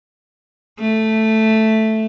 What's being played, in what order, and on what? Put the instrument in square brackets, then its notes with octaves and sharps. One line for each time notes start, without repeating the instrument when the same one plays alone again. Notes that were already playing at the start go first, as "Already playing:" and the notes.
[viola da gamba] A3